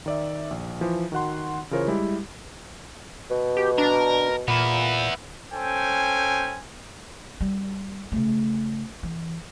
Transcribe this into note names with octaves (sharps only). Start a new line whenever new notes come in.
D#3 D5 E5
A#1
E3 F3
D#3 F#4 F#5 C6
C#3 E3 F4 A#4 C5 C#5
G3 G#3 E4 G4
B2
G4
D4 A#4
A#2 B3 E4
C#4 A4 C5 G5 G#5
G3
C#3 A3
E3